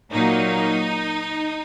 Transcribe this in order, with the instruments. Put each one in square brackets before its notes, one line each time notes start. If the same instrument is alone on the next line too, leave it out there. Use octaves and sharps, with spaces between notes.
[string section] A#2 F#3 A#3 D#4